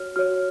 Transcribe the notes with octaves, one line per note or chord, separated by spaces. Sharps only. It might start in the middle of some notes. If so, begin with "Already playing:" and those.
Already playing: F#4 C#5 F6
F#4 C#5 F6